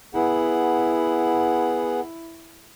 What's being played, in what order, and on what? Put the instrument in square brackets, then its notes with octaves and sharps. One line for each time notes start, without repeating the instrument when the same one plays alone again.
[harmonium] B3 G#4 F#5 [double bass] E4